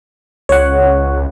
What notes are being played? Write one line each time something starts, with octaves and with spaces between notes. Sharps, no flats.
C#2 C#5 F#5